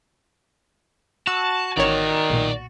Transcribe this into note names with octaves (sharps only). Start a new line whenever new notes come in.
F#4 A5 E6
A1 D#3 C#5 D5 A#5
B1 A#2